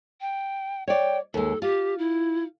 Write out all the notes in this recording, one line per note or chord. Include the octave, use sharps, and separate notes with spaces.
G5
C#5 D5 G5
D#2 G#3 A4
F4 G4
E4